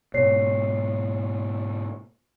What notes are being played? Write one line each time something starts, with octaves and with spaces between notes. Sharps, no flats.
G#2 B2 C#5 C7